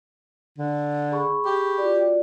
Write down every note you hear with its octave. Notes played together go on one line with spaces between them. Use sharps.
D3
G#4 B5 C#6
G4
F4 F#4 D5